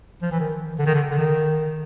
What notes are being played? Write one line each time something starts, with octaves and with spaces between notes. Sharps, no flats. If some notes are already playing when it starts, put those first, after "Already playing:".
F3
E3
D#3
D3
D#3
D3
D3
D#3